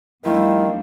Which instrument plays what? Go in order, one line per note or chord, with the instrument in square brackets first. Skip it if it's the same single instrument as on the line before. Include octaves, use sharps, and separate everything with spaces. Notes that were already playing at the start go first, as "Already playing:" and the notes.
[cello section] E2 G3 D4 [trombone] D#3 [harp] F3 A3 F4 [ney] E4